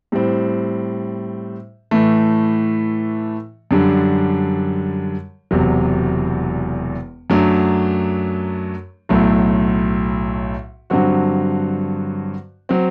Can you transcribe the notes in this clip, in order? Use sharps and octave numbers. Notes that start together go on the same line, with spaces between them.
A2 G3 C4
A2 E3 A3
F#2 D3 G3 D4
E1 E2 C3 F#3
F#2 F#3 A3 D4
B1 A2 F#3 A3
G2 D3 F#3 C4 F#4
F#3 C4